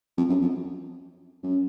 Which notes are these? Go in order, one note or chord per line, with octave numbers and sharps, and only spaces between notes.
F2
F#2
F2
F#2